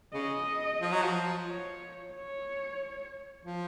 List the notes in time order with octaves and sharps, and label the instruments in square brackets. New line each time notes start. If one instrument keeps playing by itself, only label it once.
[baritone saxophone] C#3 [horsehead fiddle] D#5
[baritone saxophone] F3
F#3
F3
[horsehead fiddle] C#5
C#5
[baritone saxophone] F3